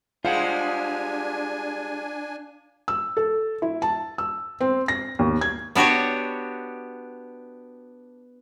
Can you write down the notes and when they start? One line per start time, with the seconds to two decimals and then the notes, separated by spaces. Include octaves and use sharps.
0.25 G3 G#3 D4 F4 C5 F5 F#5 G#5
2.88 E6
3.17 A4
3.62 E4
3.82 A5
4.18 E6
4.61 C4
4.88 A#6
5.19 D#2
5.41 G#6
5.75 B3 D4 F#4 G4 C#5